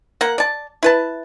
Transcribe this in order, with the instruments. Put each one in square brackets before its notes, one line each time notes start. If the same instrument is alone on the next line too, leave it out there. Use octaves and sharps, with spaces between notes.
[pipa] A#3 F#5
D5 A5
E4 B4 A5